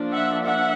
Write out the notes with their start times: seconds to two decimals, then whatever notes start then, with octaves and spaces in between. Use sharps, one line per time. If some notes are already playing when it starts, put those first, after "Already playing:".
Already playing: F3 A#3 D4
0.12 E5 F#5
0.44 E5 F#5